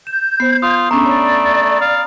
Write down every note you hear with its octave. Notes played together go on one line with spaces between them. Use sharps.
G6 E7
B3 C5 C7
F4 D#6
A3 B3 C#4 D4 A#5 B5
C#5 D5
F5